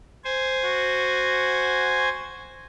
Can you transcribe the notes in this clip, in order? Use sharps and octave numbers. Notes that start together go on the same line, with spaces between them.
C5 G#5
F#4